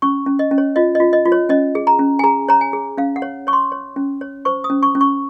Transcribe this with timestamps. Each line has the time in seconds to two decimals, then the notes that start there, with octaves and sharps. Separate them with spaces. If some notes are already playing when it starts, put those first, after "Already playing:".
0.02 C#4 C#6
0.26 C#4
0.39 D#5
0.51 C#4
0.58 C#5
0.76 F4 D#5
0.95 F4 D#5
1.13 D#5
1.26 F4
1.32 C#5
1.49 C#4 D#5
1.75 G#4
1.87 A#5
1.99 C#4
2.19 G#5
2.23 G#4 A#5
2.49 C#5 A#5
2.61 G#5
2.73 G#4
2.98 C#4 F5
3.16 F#5
3.22 C#5
3.47 C#5 C#6
3.53 C6
3.72 C#5
3.96 C#4
4.21 C#5
4.45 C5 C#6
4.64 D#6
4.70 C#4
4.83 C#6
4.95 C#4
5.01 C#6